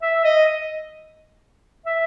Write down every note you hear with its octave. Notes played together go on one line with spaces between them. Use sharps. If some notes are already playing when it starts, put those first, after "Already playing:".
E5
D#5
E5